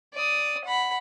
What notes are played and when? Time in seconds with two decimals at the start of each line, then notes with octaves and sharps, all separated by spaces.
0.14 D5 D#6
0.64 F#5 B5